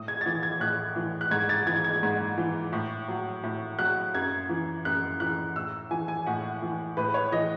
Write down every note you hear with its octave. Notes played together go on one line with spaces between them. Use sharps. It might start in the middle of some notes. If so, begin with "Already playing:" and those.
Already playing: A2 D#6
G#6
A6
E3 G#6
G#6
A2 F#6
E3
F#6
G#2 G#6
A6
E3 G#6
G#6
G#2
E3
A2
F#3
A2
F#3 F#6
F#2 G#6
E3
F#2 F#6
E3 F#6
A2 E6
E3 G#5
G#5
A2 F#5
E3
A2 B4
B4
C#5
E3 D#5